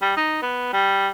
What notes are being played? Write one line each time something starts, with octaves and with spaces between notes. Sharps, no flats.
G3
D#4
B3
G3